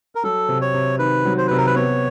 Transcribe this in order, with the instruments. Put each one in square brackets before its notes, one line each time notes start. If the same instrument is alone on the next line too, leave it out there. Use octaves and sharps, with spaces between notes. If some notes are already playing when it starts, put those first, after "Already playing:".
[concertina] A#4
[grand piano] F#3 [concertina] A4
[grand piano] C3
[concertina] C#5
[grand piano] C3
[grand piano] D#3 [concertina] B4
[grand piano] F#3
[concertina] C5
[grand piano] C3 [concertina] B4
[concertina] A#4
B4
[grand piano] B3 [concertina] C#5